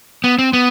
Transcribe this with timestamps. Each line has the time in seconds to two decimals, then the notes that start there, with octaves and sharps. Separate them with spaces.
0.24 B3
0.39 C4
0.53 B3